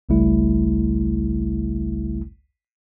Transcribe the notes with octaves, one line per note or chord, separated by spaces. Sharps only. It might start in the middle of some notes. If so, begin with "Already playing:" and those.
G#1 C#2 C#3 G3 A3 E4